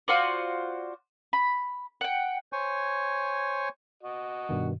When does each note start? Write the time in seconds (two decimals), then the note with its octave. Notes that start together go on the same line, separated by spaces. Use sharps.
0.08 F4 F#4 C5 D5
1.33 B5
2.01 F#5 G5
2.53 C5 C#5 G#5 C#6
4.03 F#4 D#5
4.49 G2 B2 D#3